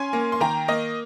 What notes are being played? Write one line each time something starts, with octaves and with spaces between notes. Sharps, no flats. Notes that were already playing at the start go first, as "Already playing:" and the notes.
Already playing: C#4 G#5 C6
A#3
C6
D#3 G5 A#5
A#3 D#5